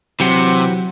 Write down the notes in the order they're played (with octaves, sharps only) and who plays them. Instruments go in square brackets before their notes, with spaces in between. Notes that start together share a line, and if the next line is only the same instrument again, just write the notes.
[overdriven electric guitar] C3 [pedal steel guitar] E3 G4 F#5 [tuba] F#3